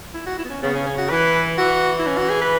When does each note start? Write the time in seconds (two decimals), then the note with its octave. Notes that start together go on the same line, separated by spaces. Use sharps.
0.14 E4
0.27 F#4
0.39 E4
0.45 B3
0.50 C#4
0.62 C#3 B3
0.75 C#4
0.86 C#4
0.98 F#4
1.10 E3 B4
1.58 E3 F#4
1.99 E4
2.07 C#4
2.18 F#4
2.30 G#4
2.42 B4